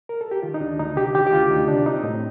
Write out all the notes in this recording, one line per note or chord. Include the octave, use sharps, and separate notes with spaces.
A#4
A4
G4
D#3 F4
D#4
D2 D4
D2 D#4
C3 G4
D#3 G4
G4
D2 F4
D2 D#4
C3 D4
C4 D#4
A2